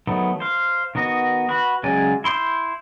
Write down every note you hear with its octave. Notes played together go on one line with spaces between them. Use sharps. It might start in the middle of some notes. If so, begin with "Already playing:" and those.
D#3 F#3 A3 B3
C5 F5
D#3 B3 F#4 D#5
F#4 B4
C#3 F#3 G#3 D5 G#5
E4 C6 D6 G6